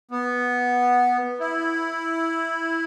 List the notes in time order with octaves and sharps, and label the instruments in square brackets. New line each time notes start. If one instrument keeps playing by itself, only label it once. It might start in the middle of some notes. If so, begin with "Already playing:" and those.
[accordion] B3
E4